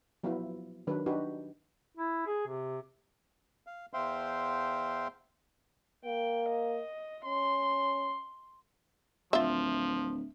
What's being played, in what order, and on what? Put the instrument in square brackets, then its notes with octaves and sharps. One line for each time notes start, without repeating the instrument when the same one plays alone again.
[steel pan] F3 F#3 B3 E4 F4
D#3 F#3 D4 B4
D4 D#4 F#4 G4 B4
[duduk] E4
G#4
C3
[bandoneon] F5
E2 C5 E5 F5 G5 C6
[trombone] A#3 [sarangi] G5
[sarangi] D#5
[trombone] C#4 [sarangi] C6
[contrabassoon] D1 [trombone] F3 [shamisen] F4 E5